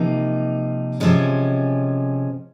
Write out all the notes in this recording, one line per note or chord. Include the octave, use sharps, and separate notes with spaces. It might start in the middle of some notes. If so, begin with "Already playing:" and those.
Already playing: C3 F3 A#3 D#4
C3 F3 G#3 C#4